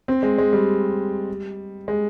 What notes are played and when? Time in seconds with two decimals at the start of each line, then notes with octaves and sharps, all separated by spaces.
0.08 C4
0.23 G#3
0.38 G#3
0.53 G3
1.88 G#3